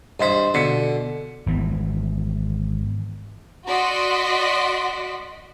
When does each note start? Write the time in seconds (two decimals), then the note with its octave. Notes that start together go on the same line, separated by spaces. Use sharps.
0.20 G2 C5 D#5 C6 B6
0.54 B2 D3 B6 C#7
1.46 G#1 E3 B3
3.68 F#4 D5 D#5 F#5 C6 B6